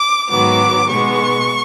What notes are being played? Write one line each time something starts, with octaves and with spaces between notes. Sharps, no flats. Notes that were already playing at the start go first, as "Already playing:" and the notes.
Already playing: D6
G#2 D#3 F#3 B3 D6
B2 G#3 B3 C#6